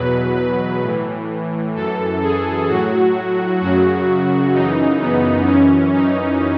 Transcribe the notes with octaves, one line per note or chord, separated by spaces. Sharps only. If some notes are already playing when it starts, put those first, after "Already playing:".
Already playing: E2 B2 F#3 B4
B4
A2 E3
F#2 E3 A4
G#4
A2 F#3 F#4
F#2 C#3 F#3 F#4
F#2 C#3 E3 D#4
B3
F#2 E3 C#4
D#4